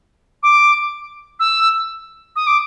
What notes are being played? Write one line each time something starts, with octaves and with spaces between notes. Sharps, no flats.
D6
E6
D#6
D6